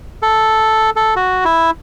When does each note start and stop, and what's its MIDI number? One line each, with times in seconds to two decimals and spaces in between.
0.22 0.90 69
0.96 1.14 69
1.16 1.44 66
1.45 1.71 64